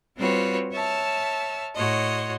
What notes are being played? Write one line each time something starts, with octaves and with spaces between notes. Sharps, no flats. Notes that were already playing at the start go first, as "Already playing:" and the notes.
G3 C4 F4 F#4 B4 C#5
C#5 E5 A5 E6 F6
A2 F#4 C#5 D#5 C6